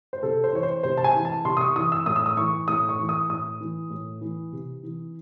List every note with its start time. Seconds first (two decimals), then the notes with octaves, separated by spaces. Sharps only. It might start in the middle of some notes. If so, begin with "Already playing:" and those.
0.13 C5
0.23 C3 A4
0.44 C5
0.53 E3 C#5
0.63 C5
0.83 C3 C5
0.97 A5
1.04 G#5
1.15 E3
1.25 A5
1.45 C3 C6
1.57 D#6
1.61 C#6
1.76 E3 D#6
1.92 E6
2.06 A2 D#6
2.16 E6
2.26 D#6
2.37 E3 C#6
2.68 A2 D#6
2.89 C#6
2.99 E3
3.09 D#6
3.29 A2 D#6
3.61 E3
3.90 A2
4.21 E3
4.52 C3
4.83 E3